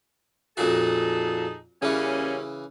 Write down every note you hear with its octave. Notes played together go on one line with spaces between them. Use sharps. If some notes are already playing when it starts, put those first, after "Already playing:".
F2 A#2 D#4 F#4 G#4 A4
C#3 E3 G3 A#3 C#4